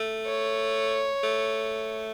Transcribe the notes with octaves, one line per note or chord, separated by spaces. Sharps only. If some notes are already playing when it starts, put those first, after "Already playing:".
Already playing: A3
C#5
A3